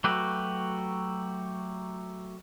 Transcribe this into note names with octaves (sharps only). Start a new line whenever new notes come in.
F#3 A3 F#4 G4 B4